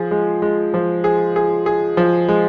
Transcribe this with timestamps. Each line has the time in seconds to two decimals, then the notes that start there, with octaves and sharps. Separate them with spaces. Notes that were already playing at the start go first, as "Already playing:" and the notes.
Already playing: F3 G#4
0.11 G#3
0.42 G#3
0.74 F3
1.04 G#4
1.36 G#4
1.66 G#4
1.97 F3
2.28 G#3